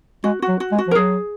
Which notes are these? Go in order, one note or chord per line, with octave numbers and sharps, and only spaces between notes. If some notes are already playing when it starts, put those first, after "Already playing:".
G#3 F#4
F#4
F#3
F#4
G#3
F#4
F3
A#4
F#3 G#4